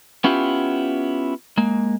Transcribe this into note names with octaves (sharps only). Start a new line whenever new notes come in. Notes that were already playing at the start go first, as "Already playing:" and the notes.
B3 C#4 E4 F4 G4
G#3 A#3